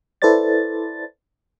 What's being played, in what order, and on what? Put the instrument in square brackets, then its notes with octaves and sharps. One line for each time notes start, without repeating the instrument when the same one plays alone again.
[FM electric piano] E4 A4 B4 C5 D5 A6